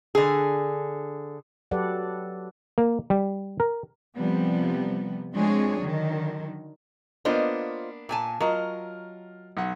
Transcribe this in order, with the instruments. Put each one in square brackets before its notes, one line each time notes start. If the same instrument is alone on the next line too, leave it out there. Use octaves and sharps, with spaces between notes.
[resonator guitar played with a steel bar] D3 G#4
[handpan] F#3 G4 A4 B4 D5 F#5
[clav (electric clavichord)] A#3
G3
A#4
[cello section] C3 F3 G3 B3
F3 G#3 C4 D4 G#4 C#5
D3 D#3 F#3
[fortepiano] A#3 B3 D4 [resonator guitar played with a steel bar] F4 C5 D#5
[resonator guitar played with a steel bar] A#2 G#5 A5
[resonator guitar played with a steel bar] F#3 D#5 [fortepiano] F4 A#4
[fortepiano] B1 F#5